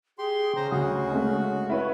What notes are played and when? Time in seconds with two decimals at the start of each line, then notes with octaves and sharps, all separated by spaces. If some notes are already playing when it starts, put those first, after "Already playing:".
0.19 G4 G#4 C6
0.56 C#3 C5 A#5
0.71 D2 F#4 D#6
1.12 G#3 A3
1.70 E4 B4 C#5